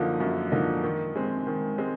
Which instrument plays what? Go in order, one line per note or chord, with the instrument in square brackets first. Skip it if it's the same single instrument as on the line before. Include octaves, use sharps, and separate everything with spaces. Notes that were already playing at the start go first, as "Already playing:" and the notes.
Already playing: [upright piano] F#2 D3 F3 A#3 D#4
F#2
D3 F3 A#3 D#4
D#3
G#3 C4
D#3
G#3 C4